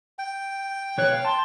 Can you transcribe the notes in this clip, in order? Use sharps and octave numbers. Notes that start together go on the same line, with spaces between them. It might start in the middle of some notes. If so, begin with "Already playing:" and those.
G5
B2 C#5 F#6
F5
A5 C6